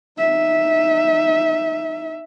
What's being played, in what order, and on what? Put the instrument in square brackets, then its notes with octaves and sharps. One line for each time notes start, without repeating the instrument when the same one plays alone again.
[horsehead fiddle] D#4 E5